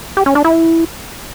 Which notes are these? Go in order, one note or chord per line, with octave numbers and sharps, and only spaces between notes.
G4
C#4
D4
E4